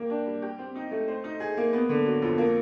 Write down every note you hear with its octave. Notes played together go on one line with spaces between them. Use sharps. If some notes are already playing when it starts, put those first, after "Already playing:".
Already playing: A#3 G4
D4
G3
G4
C4
D#4
A3
C5
D#4
G#4
A#3
B3
D3
F#3
F2
A#3